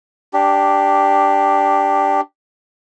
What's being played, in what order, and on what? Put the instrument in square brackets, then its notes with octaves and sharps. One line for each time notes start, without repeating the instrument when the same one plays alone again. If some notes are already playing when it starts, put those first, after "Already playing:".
[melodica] D4 G4